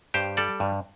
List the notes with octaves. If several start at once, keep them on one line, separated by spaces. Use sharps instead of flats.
G2 G4 C5
G3 A4 D5
G2